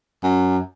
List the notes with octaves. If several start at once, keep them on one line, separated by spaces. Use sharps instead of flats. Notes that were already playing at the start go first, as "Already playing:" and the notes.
F#2